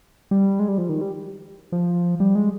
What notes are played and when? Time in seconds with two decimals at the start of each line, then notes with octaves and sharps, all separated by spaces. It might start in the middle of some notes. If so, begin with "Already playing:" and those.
0.31 G3
0.59 G#3
0.68 G3
0.78 F3
0.89 D#3
1.01 G3
1.72 F3
2.20 G3
2.35 G#3